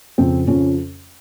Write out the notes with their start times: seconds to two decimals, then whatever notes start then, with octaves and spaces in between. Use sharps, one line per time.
0.18 F2 C#3 F3 C4
0.47 F2 C#3 F3 C#4